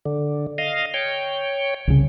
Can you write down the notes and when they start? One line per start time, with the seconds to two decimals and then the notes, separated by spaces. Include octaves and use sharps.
0.06 D3
0.58 D#5 F5
0.94 C#5 G5
1.87 C2 C#3